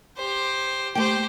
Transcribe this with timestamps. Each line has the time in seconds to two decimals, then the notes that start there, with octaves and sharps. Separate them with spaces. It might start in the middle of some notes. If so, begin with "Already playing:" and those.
0.17 G4 C5
0.95 A3 G4 C5 G5